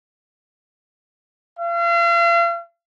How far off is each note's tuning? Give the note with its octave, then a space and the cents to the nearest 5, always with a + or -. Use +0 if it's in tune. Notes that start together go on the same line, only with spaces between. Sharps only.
F5 -40